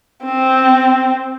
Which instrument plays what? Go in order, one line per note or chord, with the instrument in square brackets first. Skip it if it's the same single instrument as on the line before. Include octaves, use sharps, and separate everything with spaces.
[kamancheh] C4